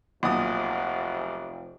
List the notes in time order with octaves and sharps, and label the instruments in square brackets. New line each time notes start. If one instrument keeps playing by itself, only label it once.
[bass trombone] F1 [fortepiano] B1 A#2 D#6